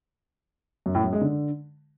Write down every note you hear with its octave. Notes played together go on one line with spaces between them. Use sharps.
F#2
A2
F#2
G#3
D3